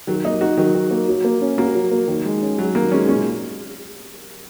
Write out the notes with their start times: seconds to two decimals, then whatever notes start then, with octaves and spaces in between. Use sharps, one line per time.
0.07 D#3 F#3
0.24 A#3 D#4
0.41 D#4 F#4
0.57 D#3 F#3
0.74 D#3
0.91 A#3
1.08 F#3
1.24 A#3
1.41 C#4
1.58 A#3 F#4
1.75 F#3
1.91 A#3
2.08 D#3
2.25 G#3
2.42 C#4
2.58 F#3 F#4
2.75 D#3 A#3
2.91 G#3 C#4
3.09 A#2 C#4